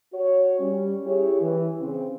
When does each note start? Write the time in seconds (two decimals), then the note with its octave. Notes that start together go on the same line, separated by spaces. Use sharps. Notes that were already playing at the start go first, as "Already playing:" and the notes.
0.13 F#4 C#5
0.59 G3 C#4
1.06 E4 G4 G#4 C#5
1.42 E3
1.81 C#3 C4